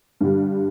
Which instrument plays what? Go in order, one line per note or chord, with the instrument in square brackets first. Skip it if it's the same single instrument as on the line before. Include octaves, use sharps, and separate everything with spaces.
[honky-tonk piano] G2 D3 G3